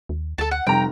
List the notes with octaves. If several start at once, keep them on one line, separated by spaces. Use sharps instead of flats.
D#2
D2 A4 A5
F#5
F1 G3 G5 A#5